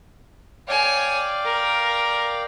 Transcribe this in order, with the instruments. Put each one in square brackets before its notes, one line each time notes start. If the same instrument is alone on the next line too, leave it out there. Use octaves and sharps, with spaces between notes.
[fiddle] C#5 G#5 [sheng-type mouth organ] D5 F5 G5
[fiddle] A#4